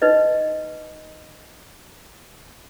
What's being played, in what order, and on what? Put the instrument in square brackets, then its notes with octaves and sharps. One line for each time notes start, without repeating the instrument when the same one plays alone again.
[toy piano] D#4 B4 D#5